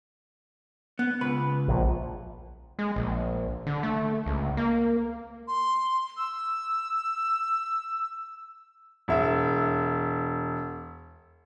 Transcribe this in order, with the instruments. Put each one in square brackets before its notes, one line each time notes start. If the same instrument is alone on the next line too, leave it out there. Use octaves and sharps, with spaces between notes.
[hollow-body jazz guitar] B3
C#2 B4
[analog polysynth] A#1
[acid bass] G#3
A#1
D3
A3
C#2
A#3
[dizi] C6
E6
[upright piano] E1 E5 E6